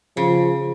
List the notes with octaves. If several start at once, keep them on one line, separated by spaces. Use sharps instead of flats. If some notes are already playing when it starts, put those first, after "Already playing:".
C#3 F3